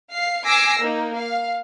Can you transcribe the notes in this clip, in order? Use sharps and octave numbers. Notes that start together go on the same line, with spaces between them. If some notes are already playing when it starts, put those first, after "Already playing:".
F5 C7
G#5 D6 E6 A#6 C7
A#3 D#4
F5